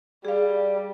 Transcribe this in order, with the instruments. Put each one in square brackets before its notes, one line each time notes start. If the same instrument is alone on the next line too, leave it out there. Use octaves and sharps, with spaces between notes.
[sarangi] G3 [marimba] G#4 F5